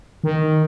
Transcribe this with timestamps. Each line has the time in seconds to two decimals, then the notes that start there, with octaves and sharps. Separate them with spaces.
0.24 D#3